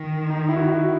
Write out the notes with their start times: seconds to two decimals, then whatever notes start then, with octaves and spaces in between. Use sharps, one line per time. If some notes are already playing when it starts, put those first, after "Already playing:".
Already playing: D#3
0.30 D#4
0.49 E4
0.56 F#4
0.74 F#4